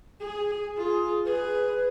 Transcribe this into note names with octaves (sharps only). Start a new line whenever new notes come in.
G#4
F4 G#4
G#4 B4